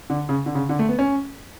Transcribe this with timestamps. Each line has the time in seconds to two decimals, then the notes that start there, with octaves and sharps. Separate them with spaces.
0.10 D3
0.29 C#3
0.46 D3
0.55 C#3
0.69 D3
0.79 A3
0.89 B3
0.99 C#4